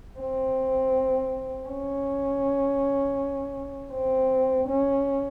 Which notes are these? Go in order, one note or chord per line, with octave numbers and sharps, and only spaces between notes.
C4
C#4
C4
C#4